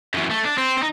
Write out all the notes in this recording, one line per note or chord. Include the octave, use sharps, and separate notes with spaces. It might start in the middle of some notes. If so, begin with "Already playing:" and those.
F#2 E3
A3
D4
C4
C4 D#4